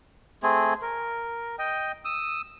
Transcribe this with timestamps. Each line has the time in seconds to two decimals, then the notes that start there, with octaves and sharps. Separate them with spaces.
0.43 A3 C4 G#4
0.82 A#4
1.59 D#5 G5
2.05 D#6 E6